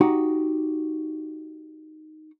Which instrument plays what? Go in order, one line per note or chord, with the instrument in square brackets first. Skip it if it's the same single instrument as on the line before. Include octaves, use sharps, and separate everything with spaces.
[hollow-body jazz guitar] D#4 F#4 G4